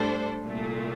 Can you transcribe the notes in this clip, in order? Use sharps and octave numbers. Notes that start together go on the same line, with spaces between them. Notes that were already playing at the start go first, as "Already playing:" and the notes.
Already playing: A2 G3 D4 A4 C5
C2 A#2 A3